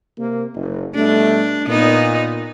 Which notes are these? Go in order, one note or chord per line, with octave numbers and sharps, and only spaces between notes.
C3 A#3
F#1
B2 G3 A3 D4
A#2 B3 D#4